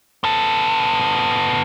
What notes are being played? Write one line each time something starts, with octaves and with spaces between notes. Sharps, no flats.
B3 A4